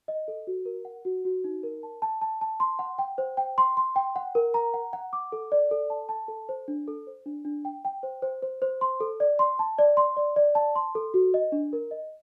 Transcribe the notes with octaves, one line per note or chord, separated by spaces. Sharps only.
D#5
A4
F#4
A#4
F#5
F#4
F#4
D#4
A#4
A5
A5
A5
A5
C6
F#5
G5
C5
G5
C6
C6
G5
F#5
A#4
A#5
F#5
F#5
D6
A4
D5
A4
A5
A5
A4
C5
D4
A4
C5
D4
D4
G5
G5
C5
C5
C5
C5
C6
A4
D5
C6
A5
D5
C6
D5
D5
A5
C6
A4
F#4
D#5
D4
A#4
D#5